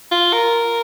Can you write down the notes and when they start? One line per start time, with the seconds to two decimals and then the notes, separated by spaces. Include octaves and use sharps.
0.11 F4
0.33 A#4